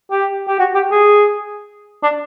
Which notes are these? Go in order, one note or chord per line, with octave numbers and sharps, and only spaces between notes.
G4
G4
F#4
G4
G#4
D4